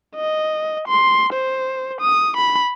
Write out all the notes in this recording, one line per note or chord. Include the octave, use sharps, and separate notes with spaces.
D#5
C6
C5
D#6
B5